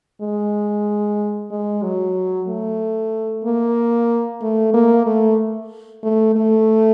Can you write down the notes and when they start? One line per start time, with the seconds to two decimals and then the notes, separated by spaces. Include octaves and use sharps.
0.21 G#3
1.51 G#3
1.83 F#3
2.48 A3
3.44 A#3
4.42 A3
4.74 A#3
5.06 A3
6.03 A3
6.36 A3